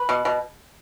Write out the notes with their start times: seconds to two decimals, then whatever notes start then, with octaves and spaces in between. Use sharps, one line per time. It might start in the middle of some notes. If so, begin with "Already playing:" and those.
Already playing: B4
0.09 B2
0.25 B2